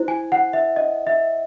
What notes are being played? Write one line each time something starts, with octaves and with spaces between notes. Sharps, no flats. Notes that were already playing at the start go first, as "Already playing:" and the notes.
Already playing: E4 C5
G#5
F#5
E5
D#5
E5